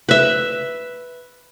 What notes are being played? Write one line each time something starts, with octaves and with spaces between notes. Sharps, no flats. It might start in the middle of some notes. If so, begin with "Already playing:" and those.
B4 E5